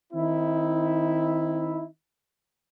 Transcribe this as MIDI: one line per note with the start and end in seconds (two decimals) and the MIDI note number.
0.13 1.86 51
0.13 1.86 60
0.13 1.86 63
0.13 1.86 64